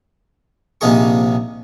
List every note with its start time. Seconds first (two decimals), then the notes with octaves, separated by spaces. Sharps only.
0.81 A#1 C3 F3 D#4 G#4 C#6